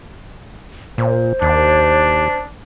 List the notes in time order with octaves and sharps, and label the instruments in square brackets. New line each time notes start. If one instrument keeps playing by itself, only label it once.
[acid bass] A#2 [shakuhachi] C5
[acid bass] D#2 [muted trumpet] D4